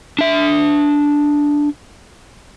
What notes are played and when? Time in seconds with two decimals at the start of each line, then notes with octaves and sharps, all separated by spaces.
0.19 D4 E5